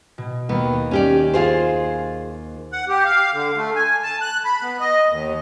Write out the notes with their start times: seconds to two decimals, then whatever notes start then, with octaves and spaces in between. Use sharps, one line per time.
0.18 B2
0.49 D#2 A#3 B3
0.91 C#4 G4 D5
1.34 F4 G#4 C5
2.72 F#5
2.89 G4
3.05 F5
3.33 D3
3.56 A3
3.76 G#5
4.03 A5
4.22 F#6
4.45 B5
4.62 B3
4.80 D#5
5.09 D#2